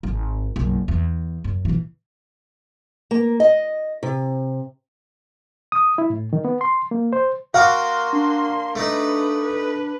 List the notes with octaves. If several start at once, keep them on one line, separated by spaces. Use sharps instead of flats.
G#1
F#1 B1
E2
F#2
B2 E3
A#3
D#5
C3
D#6
E4
A2
D#3
B3
C6
A#3
C5
A#3 F#4 F5 C6 D6 F6
D4
A3 D#4 B4 D5
B4